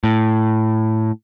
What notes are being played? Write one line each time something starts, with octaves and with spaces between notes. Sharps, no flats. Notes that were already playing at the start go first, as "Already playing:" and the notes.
A2